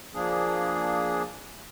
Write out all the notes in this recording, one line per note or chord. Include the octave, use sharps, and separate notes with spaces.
F3 A#3 D4 G#4